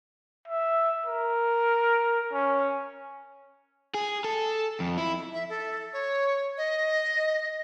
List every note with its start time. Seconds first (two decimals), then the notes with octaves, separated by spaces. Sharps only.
0.48 E5
1.06 A#4
2.33 C#4
3.94 G#4
4.24 A4
4.80 F2
4.97 E4
5.34 E5
5.50 A4
5.93 C#5
6.58 D#5